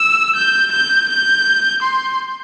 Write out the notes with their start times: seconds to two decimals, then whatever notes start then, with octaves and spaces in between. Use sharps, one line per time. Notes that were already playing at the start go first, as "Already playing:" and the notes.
Already playing: E6
0.35 G6
0.72 G6
1.09 G6
1.82 C6